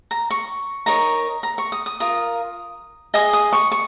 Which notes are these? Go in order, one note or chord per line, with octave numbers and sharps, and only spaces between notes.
A#5
C#6
D#4 A#4 C#5 A#5
A#5
C#6
D#6
D#6
F4 A#4 D#6
G#4 D#5 D#6
D#6
C#6
C#6